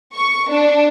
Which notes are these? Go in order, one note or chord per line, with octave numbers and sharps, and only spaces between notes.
C#6
D4